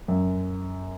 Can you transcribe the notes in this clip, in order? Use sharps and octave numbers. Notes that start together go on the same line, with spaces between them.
F#2